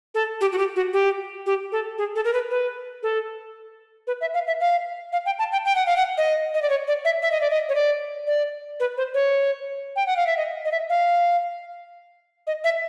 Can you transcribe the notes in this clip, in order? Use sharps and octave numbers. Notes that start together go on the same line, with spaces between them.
A4
G4
F#4
G4
F#4
G4
G4
A4
G#4
A4
A#4
B4
B4
A4
B4
E5
F5
E5
F5
F5
G5
A5
G5
G5
F#5
F5
F#5
D#5
D#5
D5
C#5
D5
E5
E5
D#5
D5
D#5
C#5
D5
D5
B4
C5
C#5
G5
F#5
F5
E5
D#5
D#5
E5
F5
D#5
E5